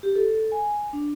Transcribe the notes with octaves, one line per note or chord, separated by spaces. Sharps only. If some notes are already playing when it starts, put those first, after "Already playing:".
G4
A4
G#5
D4